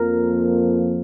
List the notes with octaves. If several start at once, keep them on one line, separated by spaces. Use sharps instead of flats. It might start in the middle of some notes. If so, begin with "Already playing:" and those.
Already playing: F2 F3 A#3 A#4